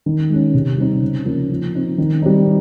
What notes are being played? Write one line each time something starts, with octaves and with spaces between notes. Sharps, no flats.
D#3
G#3 C#4
C3
G3 C4 D#4
C#3
F3 A#3 C#4
F3
C4 D#4
D#3
G3 C4 D#4